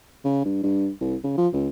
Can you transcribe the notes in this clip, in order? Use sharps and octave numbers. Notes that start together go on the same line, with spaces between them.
C#3
G2
G2
C2
C#3
F3
C#2